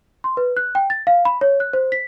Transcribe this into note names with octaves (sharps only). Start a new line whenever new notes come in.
C6
B4
F#6
G5
A6
F5
B5
C#5
F#6
C5
B6